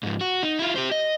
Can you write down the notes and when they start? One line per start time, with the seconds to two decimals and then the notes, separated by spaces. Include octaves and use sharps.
0.03 G#2 F3
0.21 F#4
0.43 D#4
0.59 E4 F4
0.76 G4 C5
0.91 D#5